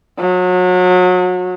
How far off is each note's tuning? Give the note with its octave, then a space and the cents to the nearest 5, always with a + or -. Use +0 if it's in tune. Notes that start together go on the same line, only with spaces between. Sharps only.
F#3 -30